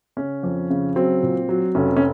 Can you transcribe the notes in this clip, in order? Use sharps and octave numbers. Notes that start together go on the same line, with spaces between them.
C#3 C#4
F2
C#3
F#3 C4
A#2
F#3
F1 C#4
C#4